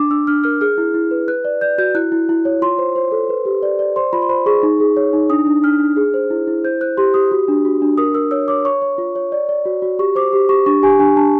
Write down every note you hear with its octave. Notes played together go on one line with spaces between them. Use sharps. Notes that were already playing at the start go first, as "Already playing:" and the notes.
Already playing: D4 D6
D4 E6
D4 F6
A#4 F6
G#4 F6
E4
E4
B4
B4 F#6
D5
D5 G6
F#4 G6
E4 F#6
E4
E4
C#5
F4 C6
C5
C5
A4
B4
G4
D5
D5
C5 C6
F4 B5
C6
C5 B5
G#4 C#6
D#4
G#4
C#5
D#4
D4 D#6
D4
D4 F6
D4
G#4
C5
E4
E4
C5 G6
C5 F#6
G4 C6
G4 D#6
F#4
D4
F#4
D4
A#4 D#6
A#4 E6
C#5 E6
C#5 D6
C#5 C#6
C#5
F4
C#5
D5
D5
F#4
F#4
G4 C#6
C5 D6
G4
G4 C#6
D4 C#6
G4 G#5
D4 G#5
D4 A5